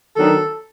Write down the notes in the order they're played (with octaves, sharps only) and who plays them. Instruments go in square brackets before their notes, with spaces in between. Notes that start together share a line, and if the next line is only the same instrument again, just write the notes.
[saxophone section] D#3 F#3 B3 D4 A4